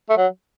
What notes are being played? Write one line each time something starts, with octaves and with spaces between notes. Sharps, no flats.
A3
F#3